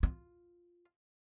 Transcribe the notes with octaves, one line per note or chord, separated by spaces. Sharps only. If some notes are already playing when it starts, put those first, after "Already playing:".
F4